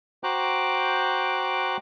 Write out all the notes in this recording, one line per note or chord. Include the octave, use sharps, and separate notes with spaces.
F#4 C5 G5 A#5 D6 F#6